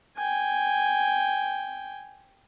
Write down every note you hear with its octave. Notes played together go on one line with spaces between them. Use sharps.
G5 G#5